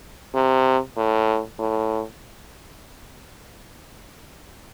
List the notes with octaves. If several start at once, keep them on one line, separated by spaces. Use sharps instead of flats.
C3
A2
A2